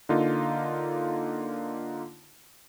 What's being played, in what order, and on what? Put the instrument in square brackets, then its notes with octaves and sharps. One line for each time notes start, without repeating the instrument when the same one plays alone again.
[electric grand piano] D3 A#3 D#4 F4